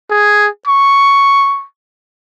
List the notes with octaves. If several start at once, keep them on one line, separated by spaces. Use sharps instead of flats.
G#4
C#6